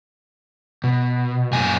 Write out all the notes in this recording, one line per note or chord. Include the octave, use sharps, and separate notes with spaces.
B2
F#2 A#2 G#5